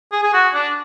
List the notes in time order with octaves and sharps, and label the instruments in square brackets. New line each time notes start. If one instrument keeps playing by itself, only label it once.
[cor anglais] G#4
G#4
F#4
D4